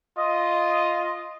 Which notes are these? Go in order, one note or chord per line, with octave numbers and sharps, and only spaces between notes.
F4 D#5